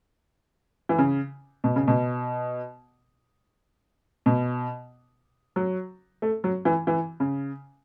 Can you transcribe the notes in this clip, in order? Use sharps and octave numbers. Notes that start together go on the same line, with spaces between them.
E3
C#3
B2
C#3
B2
B2
F#3
A3
F#3
E3
E3
C#3